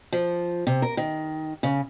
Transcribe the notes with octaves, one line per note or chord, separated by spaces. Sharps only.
F3
C3
A#4
D#3
C#3